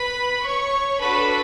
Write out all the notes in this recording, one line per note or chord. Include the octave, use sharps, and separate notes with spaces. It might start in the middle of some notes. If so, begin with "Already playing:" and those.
Already playing: B4 B5
C#5 C#6
D4 F#4 A4 B4 B5